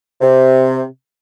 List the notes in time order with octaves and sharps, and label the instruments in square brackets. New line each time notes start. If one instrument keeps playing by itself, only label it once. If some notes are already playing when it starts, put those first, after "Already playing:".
[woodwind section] C3